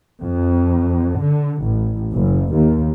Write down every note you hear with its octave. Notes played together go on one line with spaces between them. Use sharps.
F2
D3
A1
F#1
D#2